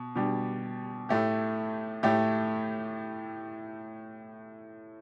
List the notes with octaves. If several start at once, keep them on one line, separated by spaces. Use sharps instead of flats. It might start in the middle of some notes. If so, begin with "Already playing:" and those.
Already playing: B2
B2 G3 D4 G4
A2 A3 G4
A2 A3 G4